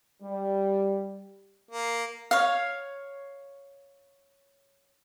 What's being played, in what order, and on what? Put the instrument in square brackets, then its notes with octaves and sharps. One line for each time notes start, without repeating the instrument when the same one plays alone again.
[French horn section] G3
[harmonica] A#3
[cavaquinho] C#5 F5